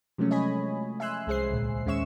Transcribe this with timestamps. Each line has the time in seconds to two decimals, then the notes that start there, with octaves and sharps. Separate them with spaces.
0.18 C3 F3 F#3 G#3 A3 C#4
0.31 C#5 D#5 G#5 B5
1.00 E5 G#5 C6 E6 F#6
1.27 C2 G#3 G#4 C5 C7
1.50 D2 A#2
1.86 D#2 G#3 C#4 E5 C#6 E7